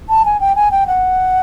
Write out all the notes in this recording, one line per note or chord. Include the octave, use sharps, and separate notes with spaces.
A5
G#5
G5
G#5
G5
F#5